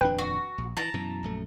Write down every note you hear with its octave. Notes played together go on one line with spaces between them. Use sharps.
D#1 F2 D4 B4 G5
F#4
A#1
E3 A5 A#5
F#2 B2 E3
A#1 F#2 A3